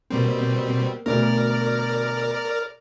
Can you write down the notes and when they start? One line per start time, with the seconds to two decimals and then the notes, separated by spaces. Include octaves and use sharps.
0.10 B2 G3 A#3 C4
1.06 D2 B2 A#4 D5 F6